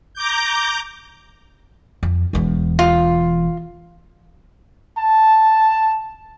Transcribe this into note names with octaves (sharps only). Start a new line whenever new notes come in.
A#5 D6 G6
F2
E1 E2
F4
A5